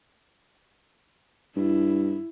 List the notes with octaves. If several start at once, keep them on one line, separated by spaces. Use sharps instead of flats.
G2 E4